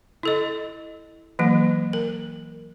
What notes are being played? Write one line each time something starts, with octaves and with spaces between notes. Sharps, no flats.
E4 A4 D#5
E3 F#3 A#3
A#4